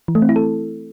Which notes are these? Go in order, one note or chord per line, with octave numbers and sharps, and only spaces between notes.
E3
A3
C4
E4
A4